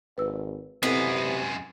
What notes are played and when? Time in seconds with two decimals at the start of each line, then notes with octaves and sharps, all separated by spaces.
0.18 G#1 B4 E6
0.83 F#2 C3 G#3 B3 C4 E4 A4